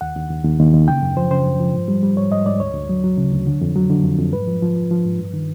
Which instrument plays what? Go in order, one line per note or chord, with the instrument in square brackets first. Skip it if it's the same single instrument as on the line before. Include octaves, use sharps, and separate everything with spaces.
[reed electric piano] D#2 F#5
D#2
D#2
D#2
D#2
D#2
C#3 G5
F#2
F3 C5
C#3 C5
F#2
F3
G#2
G3
G3
G#2 C#5
G#2 D#5
G#2 D5
D2 C#5
D2
F#3
F#3
C#3
D2
D3
F2
F#3
D3
F2
F2
G#2 B4
F3
F3
F3
F3
G#2
G2
D#3